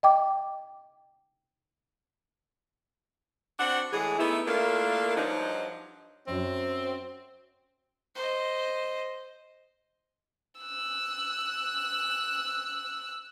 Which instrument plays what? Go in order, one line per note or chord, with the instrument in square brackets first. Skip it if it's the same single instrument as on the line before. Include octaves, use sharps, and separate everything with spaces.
[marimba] D#5 G5 D6
[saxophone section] C4 D4 F#4 F#5
A2 E3 G#3 G#4
A3 B3 D#4 E4
A3 A#3 D4 E4 F4 A#4
G2 F3 F#3 D4 D#4
[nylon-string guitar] F#2 F#3 [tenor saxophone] C4
[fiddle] C5 D#5
[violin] E6 F#6